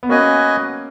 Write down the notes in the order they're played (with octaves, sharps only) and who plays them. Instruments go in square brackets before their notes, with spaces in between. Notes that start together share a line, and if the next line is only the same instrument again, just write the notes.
[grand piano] B3
[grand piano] A#3 C#4 [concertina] F#4 B4 D#5 G#5